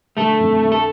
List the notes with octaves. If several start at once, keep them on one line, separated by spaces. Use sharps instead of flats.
D3 A3 A4
F2
D3
A4